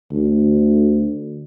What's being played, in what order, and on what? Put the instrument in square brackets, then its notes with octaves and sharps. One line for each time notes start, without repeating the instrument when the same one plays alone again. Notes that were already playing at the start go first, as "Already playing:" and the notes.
[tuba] D2